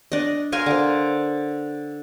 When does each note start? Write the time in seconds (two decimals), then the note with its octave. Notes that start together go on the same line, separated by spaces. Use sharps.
0.12 D4 D#5
0.52 A#4 F5 G#5 C6
0.66 D3 C5